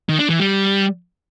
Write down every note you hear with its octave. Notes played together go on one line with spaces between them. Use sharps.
D#3
D4
E3
G3